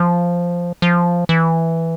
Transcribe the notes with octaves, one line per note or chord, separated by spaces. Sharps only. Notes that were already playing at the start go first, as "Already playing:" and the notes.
Already playing: F3
F3
E3